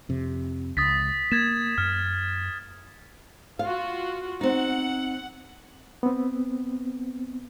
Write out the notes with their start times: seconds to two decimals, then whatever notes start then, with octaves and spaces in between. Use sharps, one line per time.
0.09 F2 C3
0.77 C#2 D#6 A6 B6
1.32 A#3 G#6 A6 E7
1.78 F#2 F6
3.59 F4 F#4 F5
4.41 C4 D#4 F#5
6.03 B3 C4